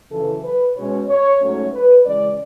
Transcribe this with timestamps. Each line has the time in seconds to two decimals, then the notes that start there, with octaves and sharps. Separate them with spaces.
0.11 F#2 C#3 E3 A4
0.44 B4
0.76 B2 G#3 C#4 C#5
1.08 C#5
1.41 G#2 F#3 A3 C#4 C#5
1.73 B4
2.06 C#3 E3 G#3 C#4 D5